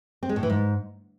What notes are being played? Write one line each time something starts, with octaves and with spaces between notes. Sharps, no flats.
C4
G#3
A2
E3
G#2